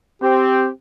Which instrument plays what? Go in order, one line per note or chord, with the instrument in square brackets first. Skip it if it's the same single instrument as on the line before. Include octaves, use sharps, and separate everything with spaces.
[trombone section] C4 [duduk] G4